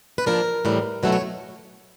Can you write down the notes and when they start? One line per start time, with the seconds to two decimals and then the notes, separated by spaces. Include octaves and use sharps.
0.18 B4
0.26 F3 A#3 D4 A#4
0.65 A2 E3 G3
1.03 B2 F#3 A3 C#4 E4
1.12 C#5